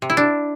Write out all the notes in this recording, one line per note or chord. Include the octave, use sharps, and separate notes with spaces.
C3
E4
D4